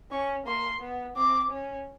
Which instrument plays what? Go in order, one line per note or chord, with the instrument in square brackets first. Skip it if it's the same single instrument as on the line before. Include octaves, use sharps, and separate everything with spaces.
[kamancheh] C#4 [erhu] C#6
[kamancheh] A#3 [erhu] C6
[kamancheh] B3
[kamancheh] C4 [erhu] D6
[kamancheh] C#4